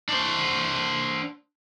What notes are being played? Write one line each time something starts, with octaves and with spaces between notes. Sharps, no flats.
D4 C5